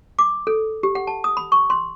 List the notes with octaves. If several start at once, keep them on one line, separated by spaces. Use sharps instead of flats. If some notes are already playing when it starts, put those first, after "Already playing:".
D6
A4
G4
F#5
A5
D#6
B5
C#6
C6